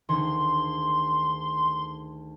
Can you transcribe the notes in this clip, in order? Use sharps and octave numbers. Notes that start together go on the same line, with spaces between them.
D2 D#3 G#4 C6